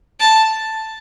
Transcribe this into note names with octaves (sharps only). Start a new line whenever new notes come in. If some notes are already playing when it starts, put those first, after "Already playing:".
A5